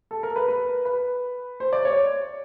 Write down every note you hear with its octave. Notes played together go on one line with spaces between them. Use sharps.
A4
A#4
B4
B4
B4
C5
D5
C#5